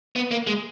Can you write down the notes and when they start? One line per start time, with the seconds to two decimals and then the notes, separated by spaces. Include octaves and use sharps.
0.16 B3
0.31 A#3
0.47 G#3